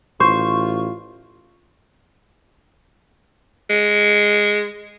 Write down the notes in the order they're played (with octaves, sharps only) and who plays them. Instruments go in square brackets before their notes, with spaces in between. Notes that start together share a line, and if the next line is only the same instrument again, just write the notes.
[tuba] A1 [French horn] F4 [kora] C5 [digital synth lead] C#6
[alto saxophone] G#3